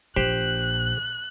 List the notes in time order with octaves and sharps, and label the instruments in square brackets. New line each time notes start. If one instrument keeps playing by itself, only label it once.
[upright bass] A#1 A#2 [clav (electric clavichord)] G4 C5 [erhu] F#6